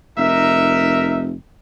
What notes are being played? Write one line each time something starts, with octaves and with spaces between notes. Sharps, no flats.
F1 D#4 A#4 E5